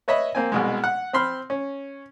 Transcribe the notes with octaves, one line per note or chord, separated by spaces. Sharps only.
B4 C#5 D#5 E5 B5
A#3 C4 G#5
C2 B2 G#3
F#5
C4 B5 C6 F6
C#4